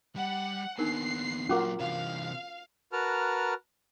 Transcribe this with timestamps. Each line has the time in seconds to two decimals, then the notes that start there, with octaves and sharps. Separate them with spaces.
0.16 G3 F#5
0.79 D#2 B3 D4 D#4 A#4 C7
1.49 A#2 F#3 C#4 F4 F#4 A#4 F#5 D6
1.80 C3 E3 F5
2.93 F#4 A#4 B4 A5 A#5 F6